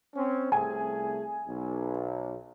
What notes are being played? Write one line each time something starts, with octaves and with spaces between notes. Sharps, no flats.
C4 C#4
C2 A3 G#4 G#5
B1